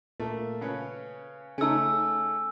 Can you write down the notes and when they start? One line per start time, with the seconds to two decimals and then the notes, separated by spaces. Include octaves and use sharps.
0.20 A#2 A3 A#3
0.61 C#3 C#4 B4
1.58 C#3 A3 C#4 D#4 G#5 E6